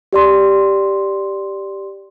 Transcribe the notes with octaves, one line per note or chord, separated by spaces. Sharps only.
G4 D5 C6